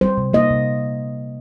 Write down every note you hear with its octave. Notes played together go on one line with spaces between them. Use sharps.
G3 C5
C3
A#3 D#5
C3